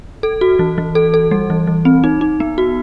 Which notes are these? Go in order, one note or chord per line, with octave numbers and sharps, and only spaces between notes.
A4
F#4
E3
E3
A4
A4
G3
E3
E3
C4
D#4
D#4
B3
F#4